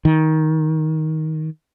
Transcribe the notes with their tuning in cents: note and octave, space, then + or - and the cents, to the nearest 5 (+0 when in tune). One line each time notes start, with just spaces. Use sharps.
D#3 +15